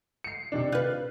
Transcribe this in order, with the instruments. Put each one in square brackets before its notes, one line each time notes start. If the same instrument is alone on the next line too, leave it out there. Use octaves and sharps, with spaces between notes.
[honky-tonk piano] C7 C#7
C3 D#3 D4
[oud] F4 B4 [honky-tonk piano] F#6